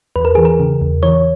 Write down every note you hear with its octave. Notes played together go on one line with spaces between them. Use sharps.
E2 B4
A#4
E3 G#4
A#4
C#3
E2
E3 C#5